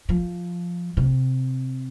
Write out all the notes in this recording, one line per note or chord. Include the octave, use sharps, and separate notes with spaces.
F3
C3